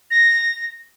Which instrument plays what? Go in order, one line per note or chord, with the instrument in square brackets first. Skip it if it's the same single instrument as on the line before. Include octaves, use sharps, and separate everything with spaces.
[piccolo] A#6